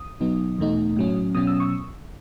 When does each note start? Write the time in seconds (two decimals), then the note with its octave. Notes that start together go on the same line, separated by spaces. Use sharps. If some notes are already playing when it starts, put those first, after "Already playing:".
Already playing: D#6
0.20 B2 F#3 B3 D#4
0.59 E2 B2 A3 D#4
0.96 A2 F#3 C#4
1.35 B2 F#3 C#4 D#6
1.47 E6
1.60 C#6